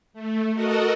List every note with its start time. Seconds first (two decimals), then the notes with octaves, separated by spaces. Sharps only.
0.13 A3
0.54 F#4 A4 A#4 D#5 F#5